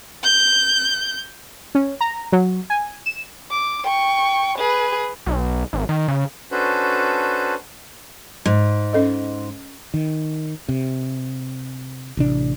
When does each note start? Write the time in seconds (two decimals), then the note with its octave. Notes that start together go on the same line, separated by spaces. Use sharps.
0.24 G6
1.75 C#4
2.01 A#5
2.32 F#3
2.70 G#5
3.06 E7
3.51 D6
3.84 G5 C#6
4.58 G#4 B4
5.26 B1
5.73 G#1
5.89 D#3
6.08 C#3
6.52 C#4 D4 F#4 A4 B4 C5
8.46 G#2
8.93 C#4 A4 D#5
9.94 D#3
10.69 C3
12.17 A1 C3 D4